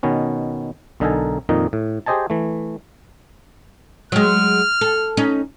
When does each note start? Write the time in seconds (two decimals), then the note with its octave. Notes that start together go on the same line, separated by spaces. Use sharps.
0.03 B2 D#3 B3 C#4
1.00 B1 D3 D#4 A4 A#4 G#5
1.49 F2 A#2 D#3 D#4 D#5
1.73 A2
2.06 G4 G#4 C5 D#5 G#5 A5
2.30 E3 A3
4.12 F#3 G#3 F6
4.81 A4
5.17 C#4 D#4